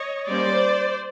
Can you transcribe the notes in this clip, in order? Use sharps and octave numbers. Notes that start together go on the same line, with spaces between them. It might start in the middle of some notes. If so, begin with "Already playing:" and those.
Already playing: C#5 D#5
G3 A#3 C#4 C5 D5